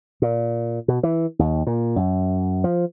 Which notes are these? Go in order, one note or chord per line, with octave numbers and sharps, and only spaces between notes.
A#2
B2
E3
D#2
A#2
F#2
F3